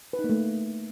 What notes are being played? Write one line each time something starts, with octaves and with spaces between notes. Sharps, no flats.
B4
D#4
A#3
A3